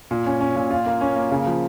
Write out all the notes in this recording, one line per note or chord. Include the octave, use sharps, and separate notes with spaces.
A#2
C#4
C#4
A#2
F4
A#3
C#4
A#3
C#3
F3